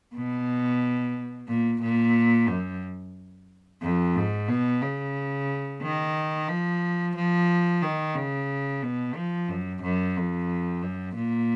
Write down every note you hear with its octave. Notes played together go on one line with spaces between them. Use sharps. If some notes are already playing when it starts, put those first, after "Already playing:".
B2
A#2
A#2
F#2
F2
G#2
B2
C#3
D#3
F3
F3
D#3
C#3
B2
F3
F#2
F#2
F2
F#2
A#2